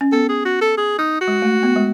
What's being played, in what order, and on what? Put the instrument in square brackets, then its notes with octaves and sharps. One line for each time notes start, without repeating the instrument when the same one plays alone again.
[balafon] C#4
[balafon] B3 [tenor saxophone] A4
[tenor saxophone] G#4
F#4
A4
G#4
D#4
F#4
[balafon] G#3
A3
B3
G#3